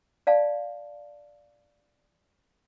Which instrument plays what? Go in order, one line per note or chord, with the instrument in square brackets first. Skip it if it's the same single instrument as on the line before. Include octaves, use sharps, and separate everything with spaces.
[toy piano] D5 F5 A5